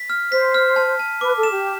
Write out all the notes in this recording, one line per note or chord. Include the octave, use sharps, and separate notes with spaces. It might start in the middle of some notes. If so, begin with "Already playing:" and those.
Already playing: B6
F6
C5 B6
F6
A5
A5
B4 D6
A4
E7
G4